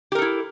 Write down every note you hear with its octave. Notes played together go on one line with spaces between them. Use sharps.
E4 G4 A4 A#4